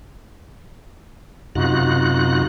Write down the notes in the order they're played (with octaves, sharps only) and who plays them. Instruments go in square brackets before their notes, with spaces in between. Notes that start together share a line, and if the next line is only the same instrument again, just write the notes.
[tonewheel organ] F#2 C3 D#4 F4 F#4 F#6